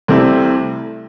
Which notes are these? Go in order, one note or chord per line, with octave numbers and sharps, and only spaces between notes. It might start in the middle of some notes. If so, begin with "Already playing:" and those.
C2 C3 A3 C4 E4